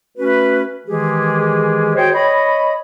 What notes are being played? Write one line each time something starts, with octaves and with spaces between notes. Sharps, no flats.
A3 C#4 F#4 B4
D#3 E3 G#3 G4 G#4
F#4 G#4 C5 C#5 D#5 G5
C#5 D#5 B5